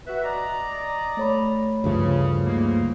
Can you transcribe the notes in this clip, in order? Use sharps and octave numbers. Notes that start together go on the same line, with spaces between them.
F#4 B4 E5
D5 D#5 A#5
A3 C#5 B5
D2 G2 C#3 F3
G#2 C#3 A#3